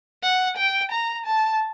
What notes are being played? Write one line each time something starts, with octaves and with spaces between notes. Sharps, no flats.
F#5
G5
A#5
A5